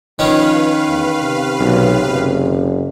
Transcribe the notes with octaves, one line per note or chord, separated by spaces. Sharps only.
D#3 F3 C#4 B4 F5
E2
C3
B1
F#1